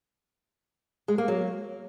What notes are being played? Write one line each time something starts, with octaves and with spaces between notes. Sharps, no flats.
G#3
A#3
F#3